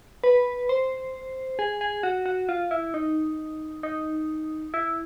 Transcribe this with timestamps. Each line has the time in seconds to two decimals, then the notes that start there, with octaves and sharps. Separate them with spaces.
0.24 B4
0.69 C5
1.59 G#4
1.81 G#4
2.03 F#4
2.26 F#4
2.49 F4
2.71 E4
2.94 D#4
3.83 D#4
4.74 E4